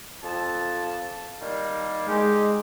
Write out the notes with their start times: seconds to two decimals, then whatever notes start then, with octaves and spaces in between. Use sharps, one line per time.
0.23 F2 A5
1.41 D#3 G3 A#3
2.07 G#3 D#4 G4